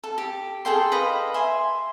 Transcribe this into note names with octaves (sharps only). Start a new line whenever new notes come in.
A4
G4
G#4 A4 G5 C6
B4 D#5 F5 B5
E5 G#5 C6